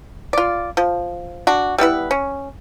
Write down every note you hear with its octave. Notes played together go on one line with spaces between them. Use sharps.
F4 D5
F3
D4 F#4
G3 B3 E4 B4
C#4